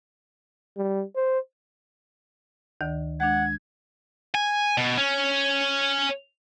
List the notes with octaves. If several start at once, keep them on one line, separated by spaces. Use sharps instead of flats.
G3
C5
D2 D#3 D5
G#3 D4 F#5 G#6
G#5
B2
C#4